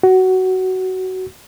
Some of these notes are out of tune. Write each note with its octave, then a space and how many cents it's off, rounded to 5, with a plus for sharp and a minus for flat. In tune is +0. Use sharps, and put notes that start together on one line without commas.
F#4 +15